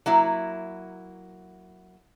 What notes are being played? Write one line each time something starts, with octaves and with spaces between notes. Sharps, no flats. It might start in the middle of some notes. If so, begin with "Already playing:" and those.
F#3 A#3 E4